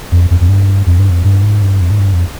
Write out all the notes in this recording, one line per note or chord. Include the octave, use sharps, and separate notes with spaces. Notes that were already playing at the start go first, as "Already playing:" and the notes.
F2
F2
F2
G2
F2
G2
F2
G2
G#2
G2
F2
G#2
G2
F2